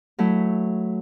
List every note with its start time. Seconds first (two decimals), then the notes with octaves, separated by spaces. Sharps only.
0.18 F#3 A3 E4